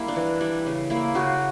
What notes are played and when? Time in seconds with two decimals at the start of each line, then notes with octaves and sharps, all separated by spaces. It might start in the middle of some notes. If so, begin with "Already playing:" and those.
Already playing: G3 A#3 E4
0.08 D4
0.16 E3
0.41 G3 E4
0.66 C#3
0.90 A#3 E4
1.15 C#3 F#4